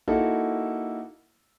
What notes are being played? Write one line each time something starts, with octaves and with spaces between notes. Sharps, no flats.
A#3 D#4 E4 F#4 A4